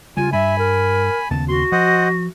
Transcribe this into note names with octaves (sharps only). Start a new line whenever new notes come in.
C#3 G3 F4 G#5
G2 G3 E5 G#5 B5
A#4
D#2 C#3 B3 A5
F#4 C6
F3 C5 D#5 F#5